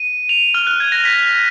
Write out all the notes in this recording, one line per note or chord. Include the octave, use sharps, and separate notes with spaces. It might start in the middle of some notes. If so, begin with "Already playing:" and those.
Already playing: D#7
F7
F6
F#6
G#6
A#6
B6